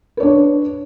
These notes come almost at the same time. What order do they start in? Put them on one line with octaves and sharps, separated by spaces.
B4 C#5 D4